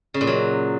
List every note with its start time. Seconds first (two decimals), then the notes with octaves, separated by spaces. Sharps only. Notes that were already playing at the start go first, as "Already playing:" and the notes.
0.14 C#3
0.21 A#2
0.27 F#3